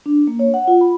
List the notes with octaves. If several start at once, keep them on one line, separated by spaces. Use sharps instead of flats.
D4
A#3
C#5
F#5
F4
B5